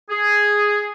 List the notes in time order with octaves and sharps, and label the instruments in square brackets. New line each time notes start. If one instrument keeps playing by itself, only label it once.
[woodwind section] G#4